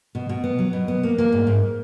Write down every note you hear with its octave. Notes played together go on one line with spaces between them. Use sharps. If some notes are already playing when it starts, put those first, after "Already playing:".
B2
B2
B3
F#3
B2
B3
A#3
A#3
G#2
G#2